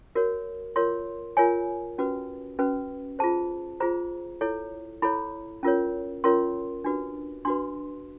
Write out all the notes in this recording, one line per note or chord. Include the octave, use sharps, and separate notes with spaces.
F#4 A#4 C#5
F4 A#4 C#5 C6
F4 A#4 C#5 G#5
C#4 F#4 B4
C#4 F#4 B4
F4 G#4 C5 A5
F4 G#4 C5 A#5
E4 A4 C#5
E4 A4 C#5 B5
C#4 F4 A#4 C#5
C#4 F4 A#4 C#5 C6
D4 F#4 B4
D4 F#4 B4 C6